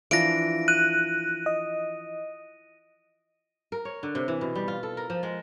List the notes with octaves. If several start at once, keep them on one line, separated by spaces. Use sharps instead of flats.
E3 F3 D4 A#6 D7
F#6 D#7
D#5
A#4
C#5
D3
C3
E3
B2
G3
F4
A4
A#4
F3
G#3